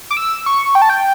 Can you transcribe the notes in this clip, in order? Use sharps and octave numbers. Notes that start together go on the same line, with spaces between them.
D6
E6
C#6
G5
A5
G5